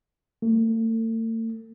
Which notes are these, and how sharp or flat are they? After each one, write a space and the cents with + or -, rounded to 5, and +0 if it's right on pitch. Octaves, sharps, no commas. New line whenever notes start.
A3 +40